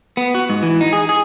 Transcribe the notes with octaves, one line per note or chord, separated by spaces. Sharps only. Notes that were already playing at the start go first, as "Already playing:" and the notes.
B3
F#4
G#2
E3
D#4
G#4
G#4